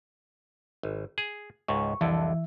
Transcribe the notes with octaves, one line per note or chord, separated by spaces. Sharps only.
G#1
G#4
C#2 G#2 C#6
C2 F2 D3 E3 E5